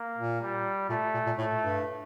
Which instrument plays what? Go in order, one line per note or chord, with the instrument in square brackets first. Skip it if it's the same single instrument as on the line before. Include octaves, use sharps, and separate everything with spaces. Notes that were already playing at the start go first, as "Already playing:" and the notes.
Already playing: [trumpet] A#3
[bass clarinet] A#2
[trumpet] G3
[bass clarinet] A#2 [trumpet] A3
[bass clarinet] A#2
A#2
[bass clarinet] A2 [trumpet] A3
[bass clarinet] G2